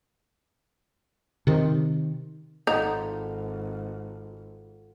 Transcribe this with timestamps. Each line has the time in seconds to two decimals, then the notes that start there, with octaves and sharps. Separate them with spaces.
1.47 C3 D#3
2.67 G#1 D#4 F4 A4 F#5